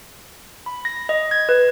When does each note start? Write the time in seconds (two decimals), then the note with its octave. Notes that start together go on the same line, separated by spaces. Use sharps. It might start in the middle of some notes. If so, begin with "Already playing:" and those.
0.66 B5
0.85 A#6
1.09 D#5
1.31 G#6
1.49 B4